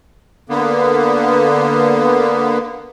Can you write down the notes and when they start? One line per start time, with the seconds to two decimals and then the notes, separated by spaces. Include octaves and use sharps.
0.49 D3 A#3 B3